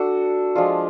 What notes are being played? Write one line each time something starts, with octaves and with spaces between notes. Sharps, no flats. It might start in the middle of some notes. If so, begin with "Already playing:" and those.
Already playing: D4 F#4 A4
F3 G#3 D4 F4